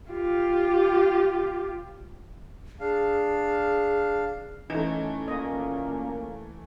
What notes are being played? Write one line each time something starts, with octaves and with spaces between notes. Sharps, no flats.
F4 G4
D4 G#4 F5
E3 A3 C#4 D#4
A#2 A#3 D#5